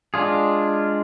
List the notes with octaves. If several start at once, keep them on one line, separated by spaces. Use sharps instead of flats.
G#3 D4 F4 G#4